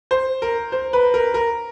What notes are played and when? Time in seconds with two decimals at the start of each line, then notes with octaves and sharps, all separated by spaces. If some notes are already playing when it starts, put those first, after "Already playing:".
0.11 C5
0.42 A#4
0.72 C5
0.93 B4
1.14 A#4
1.34 A#4